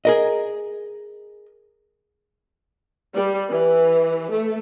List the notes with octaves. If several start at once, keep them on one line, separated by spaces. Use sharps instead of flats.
G#4 A#4 D#5
G3
E3
A3